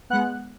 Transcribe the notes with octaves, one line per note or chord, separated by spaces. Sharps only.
G#3 B3 F#5 F#6